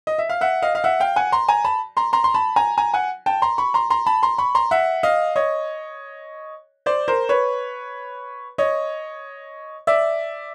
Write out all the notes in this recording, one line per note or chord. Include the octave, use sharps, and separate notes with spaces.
D#5
E5
F5
E5 F#5
D#5 F5
F5
E5 F#5
F5 G5
F#5 G#5
A#5 C6
G#5 A#5
A5 B5
A#5 C6
A#5 C6
C6
A5 B5
G#5 A#5
G#5 A#5
F#5 G#5
G5 A5
A#5 C6
B5 C#6
A#5 C6
A#5 C6
A5 B5
A#5 C6
B5 C#6
A#5 C6
E5 F#5
D#5 F5
C#5 D#5
C5 D5
A#4 C5
B4 C#5
C#5 D#5
D5 E5